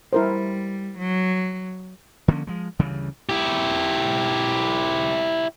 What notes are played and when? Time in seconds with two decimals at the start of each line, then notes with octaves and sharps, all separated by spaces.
0.13 G3 E4 A#4 C5
0.98 F#3
2.28 D3 F3 A#3 C#4
2.47 F3 G#3
2.79 D2 C#3 E3 G3
3.29 E4 G4